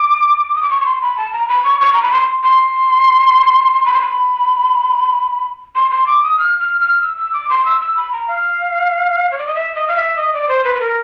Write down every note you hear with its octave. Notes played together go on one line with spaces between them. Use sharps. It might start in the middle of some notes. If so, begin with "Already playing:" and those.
Already playing: D6
D#6
D6
C#6
C#6
C6
B5
A5
A#5
B5
C#6
C#6
A#5
B5
C6
C6
B5
C6
B5
C6
C6
D6
D#6
F6
F6
F6
E6
E6
D6
C6
E6
E6
B5
A#5
F5
C#5
D5
D#5
E5
D#5
F5
E5
D#5
D5
C5
B4
B4
A#4